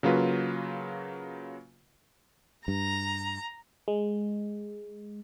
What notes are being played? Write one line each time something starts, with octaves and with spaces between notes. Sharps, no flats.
C#3 F#3 A#3 F4 B4
G2 A#5
G#3